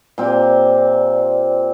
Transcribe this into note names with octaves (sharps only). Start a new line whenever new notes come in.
A#2 C4 G4 C5 D5